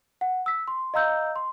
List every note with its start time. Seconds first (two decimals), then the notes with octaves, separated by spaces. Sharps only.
0.21 F#5
0.46 E6 B6
0.68 C6
0.94 D#5 F5 A#5 E6 G6
1.36 C6